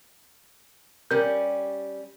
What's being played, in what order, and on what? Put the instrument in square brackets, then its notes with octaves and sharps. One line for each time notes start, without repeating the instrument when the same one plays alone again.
[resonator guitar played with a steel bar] G3 C#4 [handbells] A#4 G6